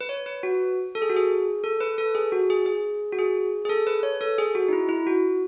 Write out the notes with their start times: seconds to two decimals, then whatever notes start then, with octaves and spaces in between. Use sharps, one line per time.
0.01 B4
0.09 C#5
0.26 B4
0.43 F#4
0.95 A4
1.02 G#4
1.10 F#4
1.17 G#4
1.64 A4
1.81 B4
1.98 A4
2.15 G#4
2.32 F#4
2.50 G#4
2.66 G#4
3.12 F#4
3.18 G#4
3.65 G#4
3.69 A4
3.87 B4
4.03 C#5
4.21 A4
4.38 G#4
4.55 F#4
4.69 D#4
4.73 E4
4.89 E4
5.07 F#4